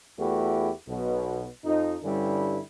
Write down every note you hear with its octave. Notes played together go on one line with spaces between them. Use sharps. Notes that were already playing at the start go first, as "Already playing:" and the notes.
E2 A3 E4 F#4 G4
B1 B2
F2 D#4
G2 D3 G3 C#4 E4